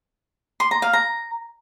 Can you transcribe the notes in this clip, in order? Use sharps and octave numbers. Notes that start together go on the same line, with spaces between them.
C6
A#5
F5
A#5